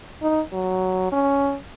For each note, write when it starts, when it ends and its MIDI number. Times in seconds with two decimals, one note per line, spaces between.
0.22 0.41 63
0.53 1.09 54
1.12 1.56 61